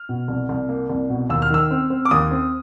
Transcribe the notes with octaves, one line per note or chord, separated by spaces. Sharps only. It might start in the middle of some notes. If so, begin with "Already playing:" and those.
Already playing: F6
B2
C2
C2
A#3
C2
B2
D#2 E6
F6
D#3 E6
C4
C4
D6
D#2 D#6
C4